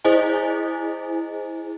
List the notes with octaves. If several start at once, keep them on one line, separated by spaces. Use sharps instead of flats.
E4 G#4 C5 D#5 G#5